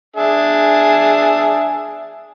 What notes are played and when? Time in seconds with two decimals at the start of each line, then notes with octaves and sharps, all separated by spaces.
0.16 D4 G#4 E5